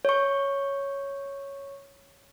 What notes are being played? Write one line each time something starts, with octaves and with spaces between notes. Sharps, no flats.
C#5 C#6